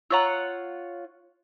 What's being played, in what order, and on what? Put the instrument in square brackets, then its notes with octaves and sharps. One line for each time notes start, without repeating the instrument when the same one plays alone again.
[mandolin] F4 C#5 F#5 [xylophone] A#5 C#6 E6